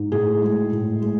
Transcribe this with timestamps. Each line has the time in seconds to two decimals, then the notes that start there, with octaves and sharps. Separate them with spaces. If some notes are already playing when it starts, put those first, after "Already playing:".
Already playing: G#2
0.12 A2 G#4
0.42 G#3
0.72 A2
1.02 G#3